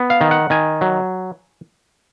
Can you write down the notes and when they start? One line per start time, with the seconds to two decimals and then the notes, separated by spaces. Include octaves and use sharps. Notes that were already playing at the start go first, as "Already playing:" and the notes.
Already playing: B3
0.10 F5
0.21 D#3
0.31 F#5
0.50 D#3 G#5
0.81 F#3